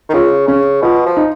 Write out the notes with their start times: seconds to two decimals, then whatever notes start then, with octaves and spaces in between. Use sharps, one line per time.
0.09 D#3
0.13 C#3 F4
0.48 C#3 C#4
0.82 B2 F4
1.06 F3
1.17 D#4